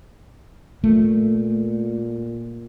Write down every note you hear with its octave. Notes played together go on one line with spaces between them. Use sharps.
A#2 A3